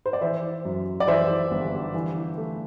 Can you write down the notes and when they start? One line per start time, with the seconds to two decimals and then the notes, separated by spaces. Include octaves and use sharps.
0.06 C5
0.13 D5
0.21 E3 C5 E5
0.65 F#2
1.00 D5
1.07 E3 C5 E5
1.51 G1
1.94 E3
2.37 A3